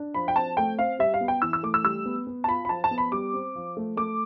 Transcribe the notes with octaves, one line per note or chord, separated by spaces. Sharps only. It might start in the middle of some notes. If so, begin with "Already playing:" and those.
Already playing: D4
F3 B5
G5
C4 A5
A3 G5
C4 F5
G3 E5
F5
B3
G5
E3 E6
E6
A3 D6
E6
G3 E6
B3
B3
A5
F4 B5
B5
F3 A5
A5
B3
B5
G3 D6
C4
F3
A3
A3 D6